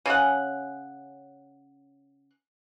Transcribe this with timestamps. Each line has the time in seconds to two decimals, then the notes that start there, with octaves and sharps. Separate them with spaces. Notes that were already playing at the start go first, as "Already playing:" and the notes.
0.06 C#3 C#4 F#5